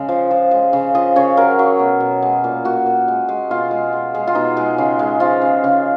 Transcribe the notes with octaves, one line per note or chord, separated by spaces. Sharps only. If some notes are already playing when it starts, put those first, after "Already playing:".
Already playing: C#3 G#3
F3
F3
G#3
C#3
F3 D#5
C#3 C#5
F#3 A#4
F#3
B2
B2
G#3
A#2
A#2 F#4
A#2
G#3
G#3
B2 F4
G#3
G#3
G#3
F4
B2 D#4
G#3
C#3
G#3
F3 F4
C#3
C#3